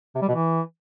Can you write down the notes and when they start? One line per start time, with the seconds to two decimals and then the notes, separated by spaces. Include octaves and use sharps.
0.15 C3
0.22 G3
0.28 B2
0.35 E3